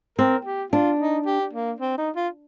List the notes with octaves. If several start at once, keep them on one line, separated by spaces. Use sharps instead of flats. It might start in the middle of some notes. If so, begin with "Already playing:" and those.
C4 A#4
G4
D4 F4
D#4
G4
A#3
C4
D#4
F4